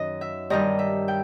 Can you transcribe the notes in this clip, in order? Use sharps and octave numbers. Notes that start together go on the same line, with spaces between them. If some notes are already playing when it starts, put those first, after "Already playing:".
Already playing: F#2 D#3 D#5
E5
G2 D#3 G3 D#5
E5
G5